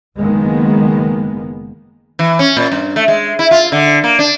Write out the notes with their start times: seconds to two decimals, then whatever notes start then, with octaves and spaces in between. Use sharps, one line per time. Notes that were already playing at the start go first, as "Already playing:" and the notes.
0.18 F#1 D#3 G#3 A#3 B3
2.19 E3
2.39 C#4
2.57 A#2
2.72 G2
2.96 A3
3.08 G#3
3.39 E4
3.51 F4
3.72 D3
4.04 A#3
4.19 D4